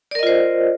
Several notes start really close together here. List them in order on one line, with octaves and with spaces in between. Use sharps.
D5 A#4 D#5 F4 C5